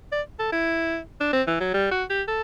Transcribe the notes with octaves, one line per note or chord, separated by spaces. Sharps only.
D5
A4
E4
D4
C4
E3
F#3
G3
F#4
G4
A4